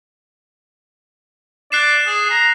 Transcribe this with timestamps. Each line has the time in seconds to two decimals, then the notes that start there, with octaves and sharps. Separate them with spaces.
1.72 D5 F#6 C7 E7
2.06 G#4
2.30 A#5